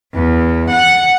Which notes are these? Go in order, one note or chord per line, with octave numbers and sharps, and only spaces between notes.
E2
F#5